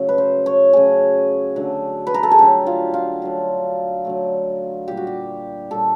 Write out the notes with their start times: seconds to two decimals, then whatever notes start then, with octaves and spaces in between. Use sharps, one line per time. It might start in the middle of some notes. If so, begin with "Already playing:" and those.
Already playing: C#3 F#3 A3
0.09 B4
0.18 C5
0.46 C#5
0.73 C#3 F#3 A3 G#4
1.56 D3 F#3 A3
2.07 B4
2.14 A#4
2.23 A4
2.31 G#4
2.38 D3 F#3 A3 G4
2.67 F4
2.94 F4
3.22 D3 F#3 A3
4.05 D3 F#3 A3
4.88 A#2 G3 G4
4.97 F#4
5.07 G4
5.71 A#2 G3 A4